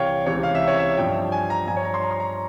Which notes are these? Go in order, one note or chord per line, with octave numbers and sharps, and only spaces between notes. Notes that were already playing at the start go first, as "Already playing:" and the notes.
Already playing: C2 C3 E3 C#5 F5 G5
C#2 C3 E3 C#5
F5
E5
C#5
E5
G2 F3 G5
G#5
A#5
G2 F3 G#5
C#5
A#5
C6
A#5
C6
A#5